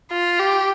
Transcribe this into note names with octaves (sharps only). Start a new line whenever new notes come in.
F4
G4